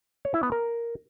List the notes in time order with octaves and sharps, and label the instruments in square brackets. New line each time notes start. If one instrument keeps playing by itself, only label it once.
[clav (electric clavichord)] C#5
E4
B3
A#4